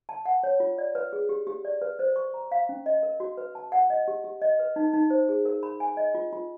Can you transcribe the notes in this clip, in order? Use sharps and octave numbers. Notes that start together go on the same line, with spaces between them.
A5
F#5
C#5
F4
D5
B4
G#4
G4
G4
D5
B4
C5
C#6
A#5
F5
C#4
D#5
A#4
F#4
B4
A5
F#5
D#5
G4
G4
D#5
B4
D#4
D#4
C5
G#4
A#4
B5
G#5
D#5
F4
F4